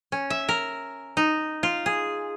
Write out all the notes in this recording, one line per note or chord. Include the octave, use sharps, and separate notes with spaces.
C#4
E5
A#4
D#4
F4
G#4